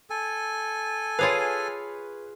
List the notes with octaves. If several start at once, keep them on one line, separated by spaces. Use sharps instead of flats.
A4 G#5
F4 G#4 B4 C#5 F5